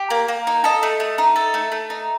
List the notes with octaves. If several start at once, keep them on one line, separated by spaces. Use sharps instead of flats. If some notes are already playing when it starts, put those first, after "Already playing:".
Already playing: G4
A#3
A#3
D#4
A4 D#5
A3
A3
D#4
A4
A3
A3
D#4